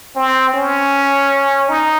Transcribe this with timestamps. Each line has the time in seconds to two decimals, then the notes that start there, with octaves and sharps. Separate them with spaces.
0.16 C4
0.54 C#4
1.69 D#4